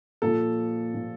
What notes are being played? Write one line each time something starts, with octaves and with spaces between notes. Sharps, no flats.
A#2 F3 A4
A#2 F3